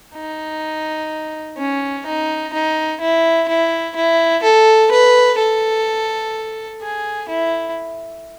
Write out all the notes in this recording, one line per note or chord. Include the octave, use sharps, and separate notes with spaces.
D#4
C#4
D#4
D#4
E4
E4
E4
A4
B4
A4
G#4
E4